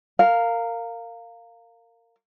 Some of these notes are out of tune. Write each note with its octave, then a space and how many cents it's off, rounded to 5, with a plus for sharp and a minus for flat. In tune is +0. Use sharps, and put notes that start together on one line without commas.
A#4 -20 F5 +0